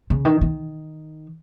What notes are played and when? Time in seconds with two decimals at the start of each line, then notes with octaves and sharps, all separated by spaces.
0.10 C#3
0.25 D#3
0.41 D#3